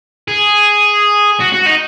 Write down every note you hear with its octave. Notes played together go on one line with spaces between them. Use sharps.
G#4
F#4
F#4
D#4